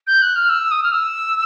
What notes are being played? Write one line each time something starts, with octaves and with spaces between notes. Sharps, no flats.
G6
F#6
F6
E6
D#6
F6
E6